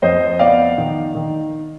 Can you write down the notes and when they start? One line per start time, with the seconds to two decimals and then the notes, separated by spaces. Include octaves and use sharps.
0.02 F2 C5 D#5
0.39 B3 D5 F5
0.78 D#3
1.15 D#3